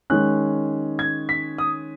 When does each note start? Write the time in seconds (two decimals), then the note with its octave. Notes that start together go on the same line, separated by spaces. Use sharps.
0.10 D#3 G#3 C#4 F#6
0.99 G#6
1.29 B6
1.58 D#6